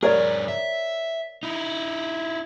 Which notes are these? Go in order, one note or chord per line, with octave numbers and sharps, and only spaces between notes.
G2 G#4 A#4 C#5 D5
E5
D#4 E4